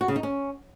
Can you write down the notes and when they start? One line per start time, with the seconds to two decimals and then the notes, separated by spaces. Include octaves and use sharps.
0.01 F#4
0.08 C#3
0.16 D#4
0.23 C#4